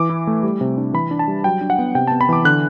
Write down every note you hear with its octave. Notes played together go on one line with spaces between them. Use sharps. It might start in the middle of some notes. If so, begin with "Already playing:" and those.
Already playing: E3 D6
E4
A3
G3
C3
D4
E3 B5
D4
A5
G3
F#3 G5
D4
F#5
B3
C3 G5
A5
B3
B5
E3 D6
D3 F#6